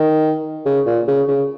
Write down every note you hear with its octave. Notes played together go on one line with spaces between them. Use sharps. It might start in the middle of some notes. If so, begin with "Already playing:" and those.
Already playing: D#3
C#3
A#2
C#3
C#3